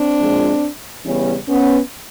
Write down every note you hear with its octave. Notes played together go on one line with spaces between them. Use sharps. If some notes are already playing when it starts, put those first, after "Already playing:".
Already playing: C4 D4
A#2 F3 G#3
C#3 E3 G3 B3 C#4
B3 C#4